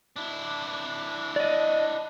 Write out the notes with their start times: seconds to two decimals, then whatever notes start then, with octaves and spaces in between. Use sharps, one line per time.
0.16 D4 E4
1.36 D5 D#5